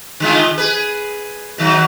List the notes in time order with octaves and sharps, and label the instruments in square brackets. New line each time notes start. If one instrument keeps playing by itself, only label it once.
[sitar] D3 G#3 F4
G#4 B4
B2 D#3 F#3